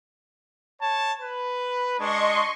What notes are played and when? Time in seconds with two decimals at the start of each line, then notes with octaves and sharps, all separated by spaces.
0.80 C#5 A5
1.20 B4
1.98 G#3 D4 D#5 C6 C#6